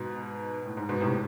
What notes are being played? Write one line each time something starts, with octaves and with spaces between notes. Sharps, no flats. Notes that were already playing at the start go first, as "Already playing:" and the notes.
Already playing: G#2 B2
A2
G#2
G#2 B2
A2 C3